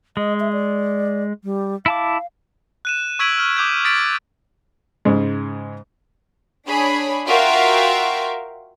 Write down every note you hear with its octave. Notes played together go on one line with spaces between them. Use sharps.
G#3 D#5
E5
D5
G3
E4 F5 A5 D6
F#6 D#7 E7
C#6 E6 G#6 B6 D7 F#7
F6 D#7
D6 D#6 G6 G#6
D#6 A6 B6 D7 F#7
G#2 C#3 G#3
D4 G#4 C#5 B5
F4 F#4 A#4 E5 F5 G5